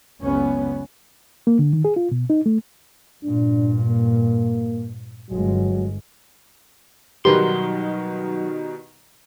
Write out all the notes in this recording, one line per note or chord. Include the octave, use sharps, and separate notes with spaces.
F#1 C#2 B3 C#4
A#3
D3
D#3
G#4
F4
B2
D#4
A3
G2 A#2 D4
A#3
G1 F#3 G#3
B2 D#3 F#3 G3 G4 A#4 B4 C6